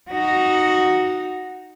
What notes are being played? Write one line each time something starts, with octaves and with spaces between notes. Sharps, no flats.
D#4 F#4